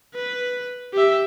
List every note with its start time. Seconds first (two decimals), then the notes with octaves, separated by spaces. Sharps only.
0.15 B4
0.93 G4 E5